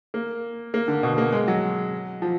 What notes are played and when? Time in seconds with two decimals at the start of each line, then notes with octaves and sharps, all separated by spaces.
0.14 A#3
0.74 A#3
0.88 D3
1.03 B2
1.18 A#3
1.32 G#3
1.48 F#3
2.22 F3